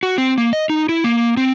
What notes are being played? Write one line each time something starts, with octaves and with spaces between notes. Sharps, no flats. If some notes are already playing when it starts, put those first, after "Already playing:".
F#4
C4
A#3
D#5
D#4
E4
A#3
C4